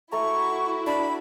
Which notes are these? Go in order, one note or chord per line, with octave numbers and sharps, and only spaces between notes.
A3 E4 F#4 A4 A#5 C#6
D4 B5